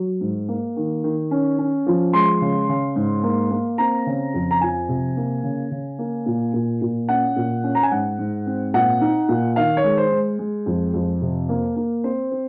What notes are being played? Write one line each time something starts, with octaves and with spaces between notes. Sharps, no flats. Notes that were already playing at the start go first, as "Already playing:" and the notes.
Already playing: F#3
G#2
A#3
D#3
D#3
C#4
C#4
F3
G#3 C6
C#3
C#3
G#2
A#3
A#3
C4 A#5
C#3
F2
A#5
F3 G#5
C3
A#3
C#3
C#3
A#3
A#2
A#2
A#2
C#4 F#5
A#2
C#4
A#5
G#5
G#2 F#5
G#2
C4
A#2 F#5
D#4
A#2
D#3 F5
C#5
G#3
C5
G#3
G#3
F2
F2
C3
A#3
A#3
C4 C5
C4